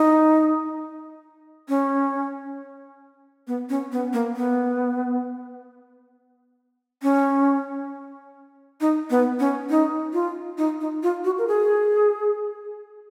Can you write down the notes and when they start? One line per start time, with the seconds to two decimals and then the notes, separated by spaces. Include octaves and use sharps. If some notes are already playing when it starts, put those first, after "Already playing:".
Already playing: D#4
1.69 C#4
3.47 B3
3.69 C#4
3.92 B3
4.13 A#3
4.36 B3
7.03 C#4
8.81 D#4
9.10 B3
9.39 C#4
9.70 D#4
10.13 F4
10.58 D#4
10.81 D#4
11.03 F4
11.24 F#4
11.38 A#4
11.48 G#4